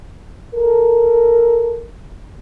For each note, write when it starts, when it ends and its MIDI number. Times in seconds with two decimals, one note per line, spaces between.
0.54 1.86 69
0.54 1.86 70